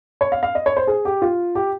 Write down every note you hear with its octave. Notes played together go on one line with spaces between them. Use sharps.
C#5
F5
F5
D#5
C#5
C5
G#4
G4
F4
G4